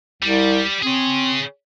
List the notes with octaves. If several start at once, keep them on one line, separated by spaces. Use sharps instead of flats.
C2 G3
C4 G#4 C#5